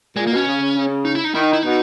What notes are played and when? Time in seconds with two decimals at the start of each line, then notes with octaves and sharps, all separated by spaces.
0.16 A#2 G#3
0.27 A#3
0.31 B2 C#4
0.46 C#3
0.61 C#3
0.76 C#3
1.05 D#4
1.15 E4
1.24 D#4
1.34 D#3 E4
1.43 D#4
1.53 E4
1.63 B2 D#4